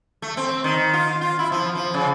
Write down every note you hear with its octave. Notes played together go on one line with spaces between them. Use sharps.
A3
C4
D#3
F4
F4
E4
F3
F3
C#3